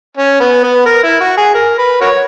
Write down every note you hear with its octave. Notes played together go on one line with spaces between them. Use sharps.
C#4
B3
B3
A#4
E4
F#4
G#4
A#4
B4
F#4 A#4 C#5